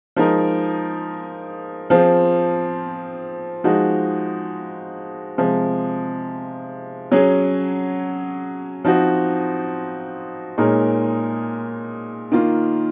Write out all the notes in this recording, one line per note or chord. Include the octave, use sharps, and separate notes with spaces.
F3 G#3 D#4 A#4
F3 C4 F4 G#4
F3 G#3 D#4 F#4
C3 F3 G#3
F#3 C#4 G#4
F3 C4 D#4 F#4
A#2 G#3 D#4 A#4 C#5
D#3 A#3 F4